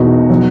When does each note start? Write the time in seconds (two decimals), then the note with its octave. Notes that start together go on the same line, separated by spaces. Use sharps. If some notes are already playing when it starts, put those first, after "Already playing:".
Already playing: E1 E2 B2 D#4 F#4
0.30 B2 F#3